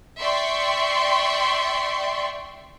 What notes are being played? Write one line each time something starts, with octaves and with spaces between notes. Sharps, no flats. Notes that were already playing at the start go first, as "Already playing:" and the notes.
D5 E5 G5 C6 C#6